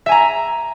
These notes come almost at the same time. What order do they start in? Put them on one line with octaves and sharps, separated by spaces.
E5 G#5 A#5